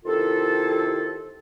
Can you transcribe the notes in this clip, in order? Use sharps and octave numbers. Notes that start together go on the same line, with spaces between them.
C3 D#3 E4 F4 A4